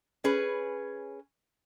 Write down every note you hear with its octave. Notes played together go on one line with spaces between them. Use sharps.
C#4 G#4 B4